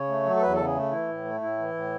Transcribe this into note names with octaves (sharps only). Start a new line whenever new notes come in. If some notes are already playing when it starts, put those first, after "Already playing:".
Already playing: C#3 C#5
A3
F#3
A4
E2 B4
C#3 A4
G#4
A3
E3 E4
A2
A3
A2 E4
E3
A2